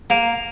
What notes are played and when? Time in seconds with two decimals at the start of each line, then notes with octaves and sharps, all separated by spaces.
0.10 A#3